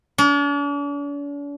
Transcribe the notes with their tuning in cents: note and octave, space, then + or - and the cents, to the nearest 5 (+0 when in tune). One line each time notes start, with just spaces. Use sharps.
D4 -45